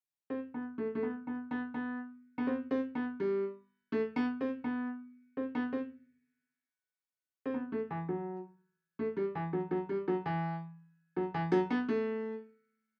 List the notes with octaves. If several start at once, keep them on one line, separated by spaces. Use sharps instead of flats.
C4
B3
A3
A3
B3
B3
B3
B3
B3
C4
C4
B3
G3
A3
B3
C4
B3
C4
B3
C4
C4
B3
A3
E3
F#3
A3
G3
E3
F#3
F#3
G3
F#3
E3
F#3
E3
F#3
B3
A3